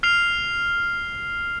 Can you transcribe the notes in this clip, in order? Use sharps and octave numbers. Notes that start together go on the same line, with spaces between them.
F6 C7 F7